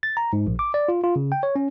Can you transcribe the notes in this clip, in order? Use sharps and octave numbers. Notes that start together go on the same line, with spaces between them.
A6
A#5
G#2
A#1
D6
D5
F4
F4
C#3
G5
C#5
C#4